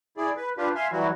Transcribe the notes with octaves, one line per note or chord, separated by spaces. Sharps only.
E4 G#4 D5
B4
D4 F4 G4 B4
E5 F5 G#5 C6
E3 F#3 G3 E4 F#4